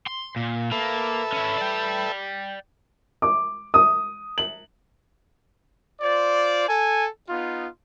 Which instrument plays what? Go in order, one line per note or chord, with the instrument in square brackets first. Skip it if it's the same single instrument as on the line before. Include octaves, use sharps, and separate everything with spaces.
[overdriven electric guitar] C6
A#2
[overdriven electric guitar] A#3 [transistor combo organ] A4 B4 E5
[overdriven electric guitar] C#4 E4
D5 G5
[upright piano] D6
D#6
F#7
[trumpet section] F4 C5 D5
A4 G#5
B3 D#4 F4